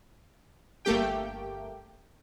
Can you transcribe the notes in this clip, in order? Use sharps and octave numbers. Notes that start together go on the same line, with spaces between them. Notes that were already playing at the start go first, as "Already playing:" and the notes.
G1 A3 A#3 G4 G5